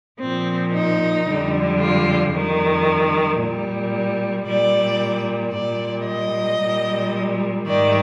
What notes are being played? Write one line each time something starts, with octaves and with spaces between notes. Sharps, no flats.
A#2 F3 C4
D#4
F2 D3 G3
F4
F2 D#3 G3
A#2 G3
A#2 G3 D5
A#2 G3 D5
D#5
A#2 G3
G#2 D#3 G3 D5